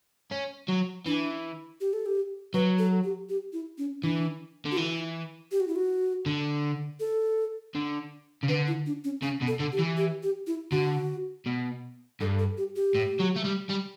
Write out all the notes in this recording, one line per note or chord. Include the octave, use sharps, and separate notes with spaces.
C#4
F#3
E3 D4
G4
A4
G4
F#3 B4
A4
G4
G4
E4
C#4
E3 D4
D3
F#4
E3 E4
G4
F#4
E4
F#4
D3
A4
D3
C#3
D3 B4
E4
D4
C#4
C#3 C#4
B2
A4
D3
G4
E3
G4
G4
E4
D3 F#4
B2
G2 A4
A4
G4
G4
A2
F#3
A3
G3
G3